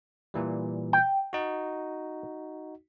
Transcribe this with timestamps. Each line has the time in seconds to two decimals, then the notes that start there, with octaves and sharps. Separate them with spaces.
0.34 A#2 E3 G3
0.93 G5
1.33 D#4 F#4